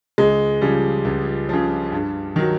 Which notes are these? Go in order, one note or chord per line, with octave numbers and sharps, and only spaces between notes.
C#2 G#3
C#3 F3 G3
C#2
C#3 F3
G2
D#3 F#3